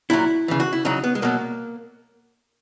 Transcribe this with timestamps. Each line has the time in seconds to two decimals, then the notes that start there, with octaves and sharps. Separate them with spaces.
0.10 A#2 F#3 E4
0.48 C#3 E3
0.60 F#4
0.73 E4
0.85 C#3 F#3 D#4
1.04 B3
1.15 G#3
1.22 B2 F#3 A#3